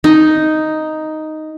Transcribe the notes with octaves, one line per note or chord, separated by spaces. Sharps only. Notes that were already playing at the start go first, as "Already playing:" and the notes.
D#4